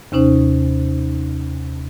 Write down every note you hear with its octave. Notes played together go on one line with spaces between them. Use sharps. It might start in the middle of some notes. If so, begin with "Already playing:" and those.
D#2 C3 C#4 D#4 C5